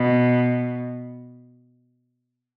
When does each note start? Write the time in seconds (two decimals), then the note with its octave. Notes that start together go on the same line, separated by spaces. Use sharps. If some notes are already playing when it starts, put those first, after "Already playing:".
Already playing: B2